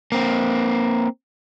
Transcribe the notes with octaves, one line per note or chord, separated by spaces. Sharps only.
A#3 C4